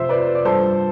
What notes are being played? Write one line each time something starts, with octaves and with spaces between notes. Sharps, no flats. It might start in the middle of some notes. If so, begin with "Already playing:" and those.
Already playing: F2 C3 F3 C5 E5
B4 D5
D5
G2 F3 A4 C5